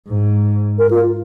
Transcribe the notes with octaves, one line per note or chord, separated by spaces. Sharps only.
G#2
A#4
F4